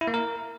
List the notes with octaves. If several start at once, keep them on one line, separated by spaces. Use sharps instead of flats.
E4
A#3
A#4